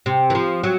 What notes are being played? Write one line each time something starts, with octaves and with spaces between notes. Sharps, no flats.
C3
E3
F3
F#3